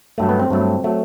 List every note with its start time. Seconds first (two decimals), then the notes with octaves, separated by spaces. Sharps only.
0.18 G2 F#3 A3
0.29 B3
0.39 C4
0.50 G2 F#3 A3
0.84 F#3 A3